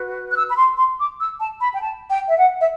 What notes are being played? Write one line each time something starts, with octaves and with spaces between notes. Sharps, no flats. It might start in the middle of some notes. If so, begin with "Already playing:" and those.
Already playing: F#4 B4
F#6
E6
B5
C6
C6
D6
E6
A5
B5
G5
A5
G5
E5
F#5
E5